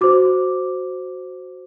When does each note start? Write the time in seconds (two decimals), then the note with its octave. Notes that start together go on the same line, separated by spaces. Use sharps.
0.01 F#4 C5 D6